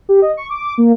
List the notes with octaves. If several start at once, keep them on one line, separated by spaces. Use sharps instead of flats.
G4
D#5
C#6
D6
A#3